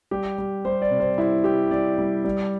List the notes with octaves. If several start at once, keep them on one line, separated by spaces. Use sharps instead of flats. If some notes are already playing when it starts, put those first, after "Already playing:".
G3 G4
G3
G3 C5
D5
C3
C5
G3 E4
G3 G4
G3 D5
G3
G3